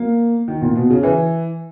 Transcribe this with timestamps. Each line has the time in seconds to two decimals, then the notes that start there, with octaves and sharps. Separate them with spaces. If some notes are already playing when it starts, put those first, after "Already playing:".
Already playing: A#3
0.48 D#3
0.62 A#2
0.75 B2
0.90 C#3
1.03 E3